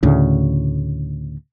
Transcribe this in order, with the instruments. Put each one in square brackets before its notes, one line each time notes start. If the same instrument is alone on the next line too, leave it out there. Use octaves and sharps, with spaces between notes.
[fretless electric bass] D2 A2 C#3